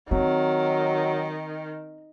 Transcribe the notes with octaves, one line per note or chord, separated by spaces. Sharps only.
D#3 F#3 C4